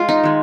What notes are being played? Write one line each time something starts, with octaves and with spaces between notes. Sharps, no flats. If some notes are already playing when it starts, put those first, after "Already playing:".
Already playing: G#3 F4
D#4
D#3 G#3